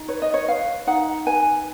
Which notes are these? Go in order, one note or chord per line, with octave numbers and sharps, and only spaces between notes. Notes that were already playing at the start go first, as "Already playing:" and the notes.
Already playing: D#4
B4 C#5
D#5
C#5
B4 F5
D#4 F#5
B4 G#5